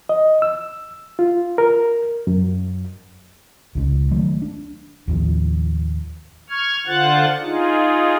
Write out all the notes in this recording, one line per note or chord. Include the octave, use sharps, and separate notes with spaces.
D#5
E6
F4
A#4
F#2
C#2 C#3 G#3
D#3 F#3 G#3 A3
D4
D#2 A2 D#3 F3
C#6 F6 G#6
D3 F4 C5 F#5 F#6 A6
D#4 F4 G#4